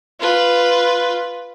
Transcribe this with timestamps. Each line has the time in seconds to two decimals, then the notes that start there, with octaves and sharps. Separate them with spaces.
0.20 F4 B4